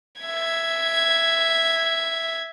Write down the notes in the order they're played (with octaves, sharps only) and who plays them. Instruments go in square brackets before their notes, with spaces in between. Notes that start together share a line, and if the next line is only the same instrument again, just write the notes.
[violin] E5 G#6